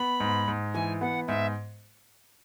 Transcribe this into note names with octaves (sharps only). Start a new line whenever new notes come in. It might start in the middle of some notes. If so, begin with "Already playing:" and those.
Already playing: B3 B5
G#2
G#2
E3 G#5
B3 F#5
G#2 E5